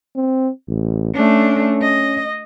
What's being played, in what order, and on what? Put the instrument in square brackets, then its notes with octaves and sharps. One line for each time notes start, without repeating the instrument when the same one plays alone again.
[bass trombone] C4
A1
[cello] A3 D4 [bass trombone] C#4
[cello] D#5